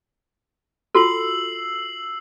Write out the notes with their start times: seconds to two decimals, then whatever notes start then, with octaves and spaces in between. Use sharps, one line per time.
0.95 F4 F#4 A4 E6 C7 F#7